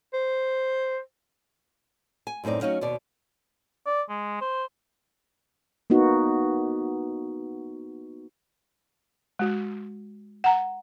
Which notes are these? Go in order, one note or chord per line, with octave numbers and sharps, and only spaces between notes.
C5
G#5
F#2 A2 C4 D#4 D5
F#3 C#4 D#4 F5
D#2 B2 D5
D5
G#3
C5
A#3 B3 D#4 F#4
G#3 F#4
F#5 A#5